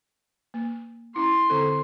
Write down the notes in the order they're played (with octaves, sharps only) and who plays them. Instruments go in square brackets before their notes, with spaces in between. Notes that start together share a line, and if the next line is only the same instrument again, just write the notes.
[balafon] A#3
[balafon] C#4 E4 [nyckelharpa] C6
[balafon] D3 C4 A4